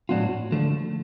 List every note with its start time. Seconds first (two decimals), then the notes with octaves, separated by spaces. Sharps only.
0.09 A2 F#3 B3 D4 F4
0.52 D3 F3 A3